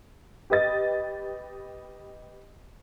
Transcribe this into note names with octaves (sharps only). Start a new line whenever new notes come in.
G4 B4 D#5 A6